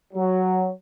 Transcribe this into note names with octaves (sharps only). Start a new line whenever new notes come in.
F#3